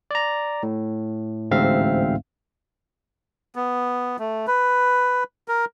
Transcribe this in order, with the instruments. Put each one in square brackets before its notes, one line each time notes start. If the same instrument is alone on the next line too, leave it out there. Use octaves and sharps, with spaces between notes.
[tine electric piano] D5 A#5
A2
A1 D2 G#2 C4 E5 F5
[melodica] B3
A3
B4
A#4